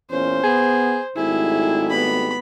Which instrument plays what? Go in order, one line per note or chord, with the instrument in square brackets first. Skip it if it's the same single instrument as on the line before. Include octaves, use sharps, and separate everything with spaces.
[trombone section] E2 A#2 C#4 [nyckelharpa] C5
[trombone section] B3 [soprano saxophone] G#4
[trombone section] G#1 G3 A3 [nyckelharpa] E4 [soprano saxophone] G#4
[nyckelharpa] B3 B5